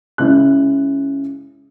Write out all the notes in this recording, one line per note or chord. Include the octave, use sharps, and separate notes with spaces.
C#3 G#3 C#4 E4 F#6